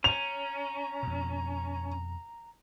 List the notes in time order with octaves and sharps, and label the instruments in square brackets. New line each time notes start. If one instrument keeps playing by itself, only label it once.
[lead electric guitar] C#4 [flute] A#5 [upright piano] F7
[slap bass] F2 B2